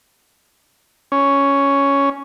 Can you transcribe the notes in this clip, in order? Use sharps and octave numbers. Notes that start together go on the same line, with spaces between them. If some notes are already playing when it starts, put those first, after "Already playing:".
C#4